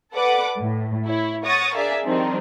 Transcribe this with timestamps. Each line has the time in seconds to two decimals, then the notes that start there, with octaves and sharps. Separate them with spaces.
0.12 A4 B4 D5 F#5 D6
0.58 A2
1.05 E4 C#5
1.43 C#5 F#5 C#6 D#6 A6 A#6
1.74 D4 G#4 A#4 D5 E5 F5
2.05 D#3 F3 G3 C4 D4 D#4